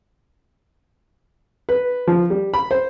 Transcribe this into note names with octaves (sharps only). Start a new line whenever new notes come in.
B4
F3
G3
B5
C5